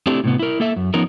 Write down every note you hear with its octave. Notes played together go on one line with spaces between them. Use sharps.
A3 C4 D4 E4 G4 A4
A2 C3 B3
E4 A#4
A#3 A4 E5
F#2
F3 B3 C#4 D#4 A#4